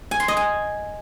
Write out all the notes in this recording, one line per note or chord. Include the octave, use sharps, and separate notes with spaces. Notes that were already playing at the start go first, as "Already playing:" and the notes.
G#5
C6
D#5
G#5